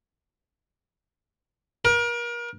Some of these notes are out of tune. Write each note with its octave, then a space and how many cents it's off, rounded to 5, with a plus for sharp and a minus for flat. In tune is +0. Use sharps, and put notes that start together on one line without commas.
A#4 +35